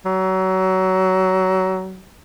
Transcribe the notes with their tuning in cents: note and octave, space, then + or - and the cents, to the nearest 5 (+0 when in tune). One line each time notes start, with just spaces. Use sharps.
F#3 +25